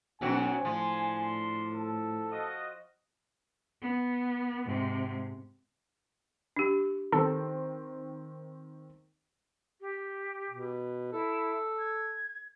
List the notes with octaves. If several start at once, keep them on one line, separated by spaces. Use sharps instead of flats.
B1 F#2 C4 F#4 G#5
A2 F3 D4 C6
A4
F4 F#4 D#5
B3
G#2 C3
D4 G4
D#3 C4 A4
G4
B2
E4 A4
G#6